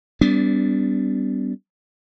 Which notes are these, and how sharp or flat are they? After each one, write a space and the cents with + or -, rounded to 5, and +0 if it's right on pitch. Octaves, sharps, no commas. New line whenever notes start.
G3 +0 B3 +25 D4 -25